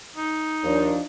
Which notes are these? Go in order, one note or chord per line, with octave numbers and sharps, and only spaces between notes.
D#4
D#2 F3 D4 D#5